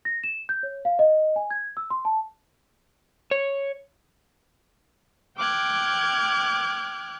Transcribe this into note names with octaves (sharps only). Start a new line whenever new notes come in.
A#6
E7
G6
C#5
F5
D#5
G#5
G#6
E6
C6
A5
C#5
G5 D6 F6 F#6 G#6